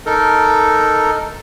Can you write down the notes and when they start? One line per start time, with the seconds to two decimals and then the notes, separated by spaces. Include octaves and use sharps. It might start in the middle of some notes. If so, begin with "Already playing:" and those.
0.06 D#4 A4 A#4